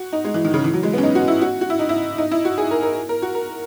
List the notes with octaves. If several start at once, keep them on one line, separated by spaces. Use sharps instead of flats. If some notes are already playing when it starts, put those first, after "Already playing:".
Already playing: F#4
D#4
G#3
E3
D#3
C#3
E3
F#3
G#3
B3
C#4
D#4
F#4
E4
F#4
F#4
E4
D#4
E4
D#4
E4
F#4
G#4
A#4
A#4
A#4
F#4
A#4